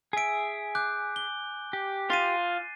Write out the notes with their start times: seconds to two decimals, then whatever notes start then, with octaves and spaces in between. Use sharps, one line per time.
0.13 G#4 E5 G#5 D7
0.75 D6 F#6 G6
1.16 G7
1.73 G4
2.10 F4 A6 C7 D#7